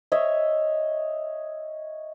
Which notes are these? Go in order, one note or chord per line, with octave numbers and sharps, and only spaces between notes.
C#5 D#5 E5